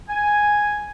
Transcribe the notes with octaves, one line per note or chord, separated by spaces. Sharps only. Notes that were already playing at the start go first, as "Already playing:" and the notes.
G#5